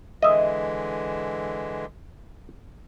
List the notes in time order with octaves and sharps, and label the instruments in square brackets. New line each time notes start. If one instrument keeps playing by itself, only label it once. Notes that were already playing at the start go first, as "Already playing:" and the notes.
[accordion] D3 E3 G#3 [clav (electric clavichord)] D#5 E5